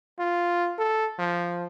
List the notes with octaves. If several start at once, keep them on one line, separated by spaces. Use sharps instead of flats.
F4
A4
F3